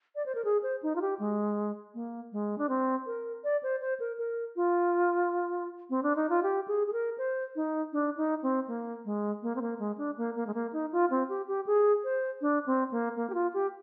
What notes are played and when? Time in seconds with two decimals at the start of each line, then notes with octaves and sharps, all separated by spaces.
0.16 D5
0.26 C5
0.35 A#4
0.45 G#4
0.63 C5
0.83 D#4
0.96 F4
1.01 G4
1.19 G#3
1.94 A#3
2.32 G#3
2.58 D4
2.69 C4
3.06 A#4
3.44 D5
3.63 C5
3.81 C5
4.00 A#4
4.18 A#4
4.56 F4
5.90 C4
6.03 D4
6.16 D#4
6.30 F4
6.43 G4
6.68 G#4
6.87 G#4
6.93 A#4
7.18 C5
7.56 D#4
7.93 D4
8.17 D#4
8.43 C4
8.68 A#3
9.05 G#3
9.42 A#3
9.56 C4
9.61 A#3
9.79 G#3
9.98 D4
10.17 A#3
10.35 A#3
10.47 G#3
10.54 A#3
10.73 D#4
10.92 F4
11.10 C4
11.29 G4
11.48 G4
11.66 G#4
12.04 C5
12.41 D4
12.66 C4
12.91 A#3
13.16 A#3
13.30 G4
13.34 F4
13.54 G4